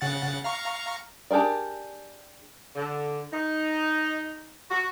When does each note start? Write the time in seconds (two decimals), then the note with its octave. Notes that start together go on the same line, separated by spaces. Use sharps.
0.01 C#3 F#5 A6
0.44 F5 A#5 C#6
1.31 D4 G4 G#4 A#4 D5
2.75 D3
3.32 D#4
4.71 F#4